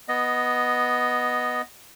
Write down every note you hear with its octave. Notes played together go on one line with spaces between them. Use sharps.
B3 D#5